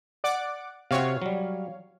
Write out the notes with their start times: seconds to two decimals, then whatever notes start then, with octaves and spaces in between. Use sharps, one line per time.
0.24 D5 F#5 D6
0.91 C3 C4 F#4 C#5 F5
1.22 F#3 G3